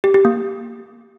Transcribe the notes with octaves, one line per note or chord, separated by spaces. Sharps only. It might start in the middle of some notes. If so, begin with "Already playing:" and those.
G4
G4
A#3